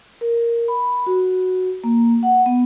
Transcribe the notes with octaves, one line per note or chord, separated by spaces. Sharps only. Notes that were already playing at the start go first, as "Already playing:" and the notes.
A#4
B5
F#4
A#3
F#5
B3